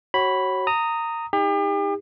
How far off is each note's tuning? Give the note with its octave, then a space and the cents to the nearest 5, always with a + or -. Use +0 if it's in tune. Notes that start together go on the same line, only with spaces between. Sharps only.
F#4 +25 C#5 -25 B5 +0
A#5 -20 D#6 +0
D#4 +30 G4 +40